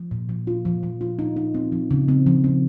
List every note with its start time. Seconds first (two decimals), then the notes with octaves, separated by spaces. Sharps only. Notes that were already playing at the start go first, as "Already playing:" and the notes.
Already playing: F3
0.11 A#2
0.29 F3
0.47 F4
0.65 F3
0.83 F3
1.01 F4
1.19 D#4
1.36 D#4
1.54 C4
1.72 F3
1.91 C#3
2.08 C4
2.26 F3
2.44 C4